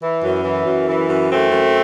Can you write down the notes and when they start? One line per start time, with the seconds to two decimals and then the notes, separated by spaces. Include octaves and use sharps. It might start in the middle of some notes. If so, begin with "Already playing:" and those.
0.03 E3
0.23 F#2
0.44 E3
0.66 F#2
0.88 E3
1.09 F#2
1.30 E3 A3 C4
1.52 F#2